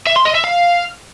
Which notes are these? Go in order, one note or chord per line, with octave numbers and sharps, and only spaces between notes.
E5
C6
D#5
E5
F5